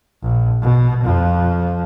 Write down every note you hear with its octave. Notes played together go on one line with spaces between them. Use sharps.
A#1
B2
F2 F3